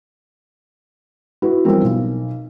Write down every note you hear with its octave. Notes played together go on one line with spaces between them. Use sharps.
E4 F#4 B4
E3 F3 G3 C4 A#4
B1